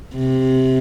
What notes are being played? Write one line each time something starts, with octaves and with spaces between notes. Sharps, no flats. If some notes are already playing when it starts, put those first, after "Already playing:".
C3